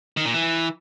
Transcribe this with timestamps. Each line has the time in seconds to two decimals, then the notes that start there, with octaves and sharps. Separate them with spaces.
0.17 D#3
0.25 A#2
0.34 E3